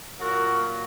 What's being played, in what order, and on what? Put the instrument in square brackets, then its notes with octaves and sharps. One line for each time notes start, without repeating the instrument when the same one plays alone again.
[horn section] A#2 F#3 F#4 A#4